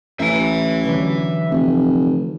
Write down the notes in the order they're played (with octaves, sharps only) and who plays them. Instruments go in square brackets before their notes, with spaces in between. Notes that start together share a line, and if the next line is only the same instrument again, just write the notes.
[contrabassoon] A1 [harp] A#3 E4 [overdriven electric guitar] E5 G#5
[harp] D3 E3 F#3
[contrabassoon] F1